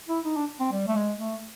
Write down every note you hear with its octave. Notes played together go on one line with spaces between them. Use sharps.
E4
D#4
D4
C4
G3
A3
G#3
A3